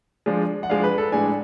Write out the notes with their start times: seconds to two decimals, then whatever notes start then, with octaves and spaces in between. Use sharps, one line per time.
0.26 F3 G#3 D4
0.63 F#5
0.69 F3 G#3 D4 F5
0.84 B4
0.98 A4
1.12 A2 G#3 D4 G#5